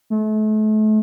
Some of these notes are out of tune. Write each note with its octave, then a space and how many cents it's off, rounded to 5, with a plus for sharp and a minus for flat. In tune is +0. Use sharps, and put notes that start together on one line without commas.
A3 -35